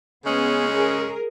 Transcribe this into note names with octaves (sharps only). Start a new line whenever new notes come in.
C#3 G#3 B3 C#4
G#4 A#4